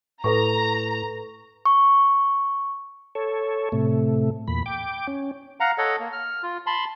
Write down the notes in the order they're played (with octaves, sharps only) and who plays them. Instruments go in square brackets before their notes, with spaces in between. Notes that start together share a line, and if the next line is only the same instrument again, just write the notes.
[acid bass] A2 [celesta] A4 B4 C#6 [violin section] A#5
[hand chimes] C#6
[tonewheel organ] A4 C#5
A2 C3 A3
E2 A#2 B5
G5 D6
C#4
[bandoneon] F5 F#5 A#5
A4 C#5 D#5 F#5
A#3
F6
F4
A5 B5 C6